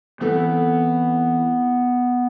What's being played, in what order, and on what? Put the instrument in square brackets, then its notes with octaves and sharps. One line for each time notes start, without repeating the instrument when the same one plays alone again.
[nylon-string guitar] E3 A3 C4 E4 [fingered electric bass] B3